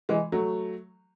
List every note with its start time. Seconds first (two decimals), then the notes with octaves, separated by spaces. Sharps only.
0.09 E3 G#3
0.32 F#3 A3